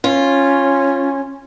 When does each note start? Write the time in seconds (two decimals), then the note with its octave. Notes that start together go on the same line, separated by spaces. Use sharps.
0.04 C#4 F4